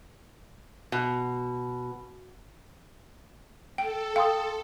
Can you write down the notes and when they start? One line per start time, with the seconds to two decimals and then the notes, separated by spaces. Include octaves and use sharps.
0.92 B2
3.78 A4 G5
4.16 F5 G5 C6 D#6